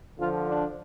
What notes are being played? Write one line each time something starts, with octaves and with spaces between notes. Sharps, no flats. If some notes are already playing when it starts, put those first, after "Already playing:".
D3 F3 F4
D4